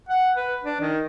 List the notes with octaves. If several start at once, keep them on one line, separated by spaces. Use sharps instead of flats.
F#5
B4
D4
D#3